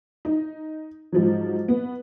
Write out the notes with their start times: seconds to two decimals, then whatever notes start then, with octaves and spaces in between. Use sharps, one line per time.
0.25 D#4
1.12 G#2 F3 F#3
1.68 B3